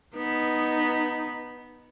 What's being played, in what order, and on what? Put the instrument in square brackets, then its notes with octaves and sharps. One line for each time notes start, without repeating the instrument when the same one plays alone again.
[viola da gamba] B3 [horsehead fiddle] D#4